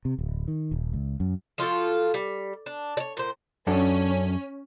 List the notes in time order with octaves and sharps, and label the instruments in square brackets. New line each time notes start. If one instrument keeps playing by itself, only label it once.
[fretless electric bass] C3
D1
D#3
D#1
C#2
F#2
[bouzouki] F3 F4 F#4 A4
G3
D4
C#5 D5
A#2 C5
[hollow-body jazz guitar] F#2 D4 A4 [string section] C#4